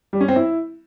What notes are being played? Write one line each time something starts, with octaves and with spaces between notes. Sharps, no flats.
G3
C#4
C4
E4